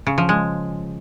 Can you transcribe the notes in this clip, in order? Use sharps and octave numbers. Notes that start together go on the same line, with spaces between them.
C#3
F3
G#3